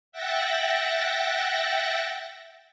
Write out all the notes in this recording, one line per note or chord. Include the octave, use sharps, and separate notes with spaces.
E5 F#5 G5 F#6 A6 A#6